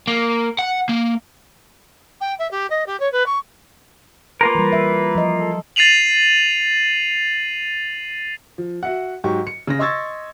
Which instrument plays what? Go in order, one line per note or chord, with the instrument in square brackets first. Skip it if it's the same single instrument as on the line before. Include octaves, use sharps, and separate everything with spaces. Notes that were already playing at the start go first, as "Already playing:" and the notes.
[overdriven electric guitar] A#3
F#5
A#3
[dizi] G5
E5
G4
D#5
G4
C#5
B4
C#6
[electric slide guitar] A#3 F4 A#4 [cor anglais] B4
[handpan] E3 G3
E5
F3 F#3 D#5
[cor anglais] A4
[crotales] A6 C7 D#7 F7 F#7
[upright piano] F3
F#4 E5 F#5
G#2 F#3 G4 C#6
C#7
C#3 A#6
D#5 C6 C#6 E6 G#6 A6